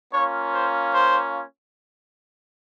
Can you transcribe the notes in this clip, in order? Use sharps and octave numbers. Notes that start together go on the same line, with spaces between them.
A#3 C#4 F4 C#5
C5
C5